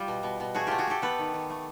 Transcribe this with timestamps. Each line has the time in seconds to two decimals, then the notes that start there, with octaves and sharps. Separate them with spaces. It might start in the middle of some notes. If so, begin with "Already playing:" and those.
Already playing: G3 F4 G4
0.08 B2
0.23 B2
0.40 B2
0.55 A3 F#4 G#4
0.67 A3 F4 G4
0.78 F#4 G#4
0.87 A3 G4 A4
1.02 B3 A4 B4
1.18 D#3
1.34 D#3
1.50 A3